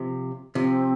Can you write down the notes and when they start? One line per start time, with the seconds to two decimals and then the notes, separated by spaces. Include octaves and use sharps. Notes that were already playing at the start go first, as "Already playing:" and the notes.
Already playing: C3 F3
0.55 C3 F3 C4